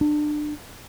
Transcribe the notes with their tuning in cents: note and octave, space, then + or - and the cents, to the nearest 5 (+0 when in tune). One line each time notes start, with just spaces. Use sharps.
D4 +25